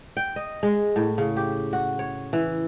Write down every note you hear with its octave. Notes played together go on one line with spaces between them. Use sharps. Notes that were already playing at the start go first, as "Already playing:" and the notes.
G5
D#5
G#3
A2
C#3
G4
F#4
C#5
E3